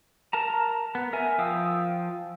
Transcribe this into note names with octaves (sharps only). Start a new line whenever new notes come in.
A#4 A5 A#5
B3
A#4 E5 G#5
F3 F5 G5 D#6 E6